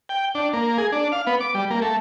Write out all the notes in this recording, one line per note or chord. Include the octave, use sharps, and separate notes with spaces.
G5
D4
A#3
G#4
D4
F5
B3
D6
G3
A#3
A3